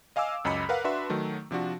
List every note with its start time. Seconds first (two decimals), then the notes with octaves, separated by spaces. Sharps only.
0.16 D#5 F5 G#5 D6 E6
0.45 C#2 F#2 D#5 B5 B6 C#7
0.69 A#4 B4 F5 F#5
0.84 D4 F#4 B4 E5 C6
1.10 D#3 F#3 A3
1.51 C3 F3 D4 F#4